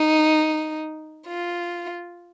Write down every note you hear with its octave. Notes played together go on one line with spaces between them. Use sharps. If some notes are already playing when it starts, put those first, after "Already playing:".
Already playing: D#4
F4